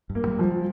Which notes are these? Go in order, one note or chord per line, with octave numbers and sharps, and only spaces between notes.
G2
A#3
G3
F3
G3